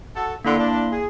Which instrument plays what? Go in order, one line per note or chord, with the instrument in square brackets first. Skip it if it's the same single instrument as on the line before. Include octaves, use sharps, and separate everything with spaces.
[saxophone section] F#4 A4
[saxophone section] D3 [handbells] A#3 E4 C6
[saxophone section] D4
G#4